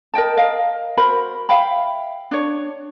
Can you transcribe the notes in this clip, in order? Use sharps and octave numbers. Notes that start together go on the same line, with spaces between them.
A#4 D#5 G5 A5
A#4 D#5 F5
F#4 A#4 C5 B5
E5 F5 G5 B5
D4 C#5